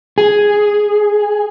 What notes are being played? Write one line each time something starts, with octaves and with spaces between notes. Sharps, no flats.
G#4